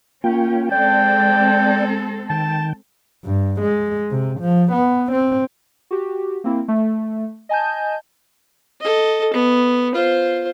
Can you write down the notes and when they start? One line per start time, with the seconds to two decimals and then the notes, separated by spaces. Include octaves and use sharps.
0.24 A#3 C#4 F4 G5
0.72 G#3 C4 A4 D5 G5
2.30 D#3 G5 A5
3.25 G2
3.61 G#3
4.11 C3
4.40 F3
4.72 B3
5.12 C4
5.91 F#4 G4
6.44 A#3 C4 E4
6.68 A3
7.49 D#5 G#5 A5 G6
8.81 A4 D#5
9.34 B3
9.95 F4 C5